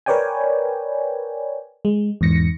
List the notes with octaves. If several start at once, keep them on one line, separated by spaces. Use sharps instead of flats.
A#4 B4 C#5 D5 G5 G#5
G#3
E2 G#2 A#6 C#7